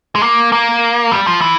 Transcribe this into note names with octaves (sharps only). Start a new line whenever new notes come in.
G#3
A#3
A#3
G3
F3
E3